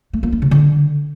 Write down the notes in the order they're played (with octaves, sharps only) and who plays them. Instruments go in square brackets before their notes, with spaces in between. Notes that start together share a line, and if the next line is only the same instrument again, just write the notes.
[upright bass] A3
A#3
D4
C#3
D3